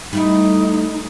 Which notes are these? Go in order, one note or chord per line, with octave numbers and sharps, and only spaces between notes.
G3 A3 D#4 E4